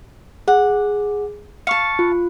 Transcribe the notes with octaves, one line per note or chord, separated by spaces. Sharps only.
G#4 F#5
F5 A5 C#6 C#7
F4